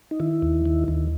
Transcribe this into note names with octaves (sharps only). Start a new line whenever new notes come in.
D#4
D#3 E4
D#2
D#3
D#2